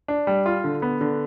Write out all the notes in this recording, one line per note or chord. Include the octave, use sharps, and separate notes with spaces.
D4
G3
F4
D3
B3
D3